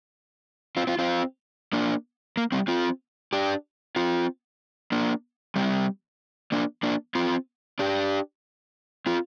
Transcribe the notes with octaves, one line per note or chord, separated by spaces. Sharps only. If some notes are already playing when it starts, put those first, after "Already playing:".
C4 F4
C4 F4
C4 F4
A#3 D4
A#3
G3 C4
C4 F4
D4 G4
C4 F4
A#3 D4
G3 C4
A#3 D4
A#3 D4
C4 F4
D4 G4
C4 F4